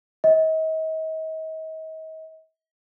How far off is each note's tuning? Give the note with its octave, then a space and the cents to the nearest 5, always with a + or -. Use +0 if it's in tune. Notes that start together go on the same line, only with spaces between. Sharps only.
D#5 +40